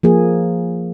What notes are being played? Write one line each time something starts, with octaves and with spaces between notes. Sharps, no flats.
F3 A#3 G#4